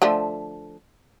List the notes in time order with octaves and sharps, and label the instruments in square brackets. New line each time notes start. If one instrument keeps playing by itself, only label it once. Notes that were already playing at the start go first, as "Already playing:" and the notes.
[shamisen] D3 F3 A3